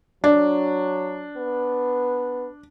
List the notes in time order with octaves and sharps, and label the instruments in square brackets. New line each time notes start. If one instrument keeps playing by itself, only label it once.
[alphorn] F#3 [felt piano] D4
[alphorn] B3